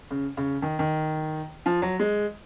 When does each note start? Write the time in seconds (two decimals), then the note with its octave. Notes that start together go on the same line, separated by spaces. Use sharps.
0.11 C#3
0.37 C#3
0.62 D#3
0.79 D#3
1.66 F3
1.82 F#3
1.99 G#3